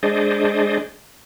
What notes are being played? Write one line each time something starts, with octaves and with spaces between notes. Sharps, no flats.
G#3 D4 G#4 C5 D5 D#5